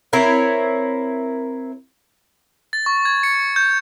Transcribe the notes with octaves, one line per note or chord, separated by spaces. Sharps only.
C4 E4 A#4 C#5
A6
C#6
G#6
C#7
G6